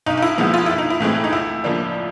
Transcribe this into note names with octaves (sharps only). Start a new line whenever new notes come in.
B1 D#4
D#4
E4
A#2 F3 G#3 B3
F4
B1 E4
D#4
E4
A2 E3 G#3 C4
D#4
C#2 E4
C#3 F3 A#3 D4